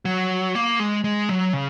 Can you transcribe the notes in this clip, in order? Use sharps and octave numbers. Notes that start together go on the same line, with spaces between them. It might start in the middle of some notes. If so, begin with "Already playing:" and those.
F#3
A#3
G#3
G#3
F#3
C#3